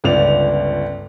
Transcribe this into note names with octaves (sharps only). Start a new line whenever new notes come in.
G1 C#2 C#4 D5 F7